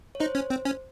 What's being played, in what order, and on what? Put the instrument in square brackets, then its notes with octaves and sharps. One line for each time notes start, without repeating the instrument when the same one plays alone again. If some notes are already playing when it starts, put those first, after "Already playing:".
[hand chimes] C#5
[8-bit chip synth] D#4 [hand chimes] C5
[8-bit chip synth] C#4
C4
C#4